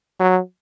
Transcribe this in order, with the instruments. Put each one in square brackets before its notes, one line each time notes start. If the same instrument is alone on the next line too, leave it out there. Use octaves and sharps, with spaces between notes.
[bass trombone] F#3